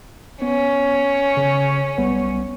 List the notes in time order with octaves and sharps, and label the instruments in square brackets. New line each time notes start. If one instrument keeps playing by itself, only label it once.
[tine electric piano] B3 [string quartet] C#4
[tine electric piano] C#3
B1 G3 B3